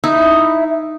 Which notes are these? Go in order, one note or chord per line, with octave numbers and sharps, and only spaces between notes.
D#4 E4